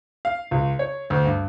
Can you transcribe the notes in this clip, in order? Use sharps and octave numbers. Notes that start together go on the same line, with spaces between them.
F5
C#2
C#5
D2
G2